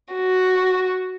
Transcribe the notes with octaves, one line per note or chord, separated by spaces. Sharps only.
F#4